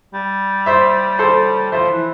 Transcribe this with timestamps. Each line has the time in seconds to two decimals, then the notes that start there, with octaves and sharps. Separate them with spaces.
0.14 G3
0.66 C5 E5
1.19 A4 C5
1.72 F3 C5 E5
1.90 E3